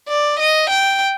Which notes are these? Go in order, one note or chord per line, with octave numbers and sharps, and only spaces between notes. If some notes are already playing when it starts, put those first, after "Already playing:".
D5
D#5
G5